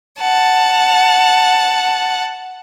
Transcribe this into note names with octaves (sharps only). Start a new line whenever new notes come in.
F#5 A5